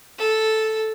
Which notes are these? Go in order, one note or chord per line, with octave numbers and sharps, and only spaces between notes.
A4